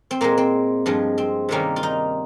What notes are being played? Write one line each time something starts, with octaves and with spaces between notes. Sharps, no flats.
C4
A#2 G#3 A#3
C4
G2 F3 G#3
C4
C3 D#3 G3 A#3 C#4
F4
D#4